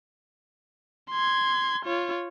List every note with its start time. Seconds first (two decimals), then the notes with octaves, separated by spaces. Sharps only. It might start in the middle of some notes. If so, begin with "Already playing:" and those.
1.11 C6 G#6
1.86 F4 C#5